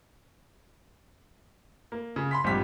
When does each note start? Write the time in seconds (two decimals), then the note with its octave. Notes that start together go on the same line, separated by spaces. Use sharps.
1.92 A#3
2.16 C#3
2.31 B5 C6 B6
2.44 G#1 G2 A#2 F3 G4 B6